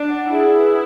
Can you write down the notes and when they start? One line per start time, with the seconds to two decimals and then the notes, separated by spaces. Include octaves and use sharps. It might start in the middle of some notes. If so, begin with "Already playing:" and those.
Already playing: D4 D5
0.10 F#5
0.31 E4 G#4
0.53 B4